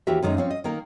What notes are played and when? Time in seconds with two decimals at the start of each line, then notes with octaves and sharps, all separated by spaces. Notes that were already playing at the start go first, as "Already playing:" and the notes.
0.07 D#2 E3 F#4 G4 A#4 E5
0.22 F#2 D#3 G3 G#3 A#3 D#4
0.37 F3 C4 C#4
0.51 D#5
0.64 D#3 A#3 A#4